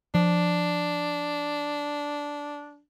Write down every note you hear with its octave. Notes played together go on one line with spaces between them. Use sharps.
F3 D4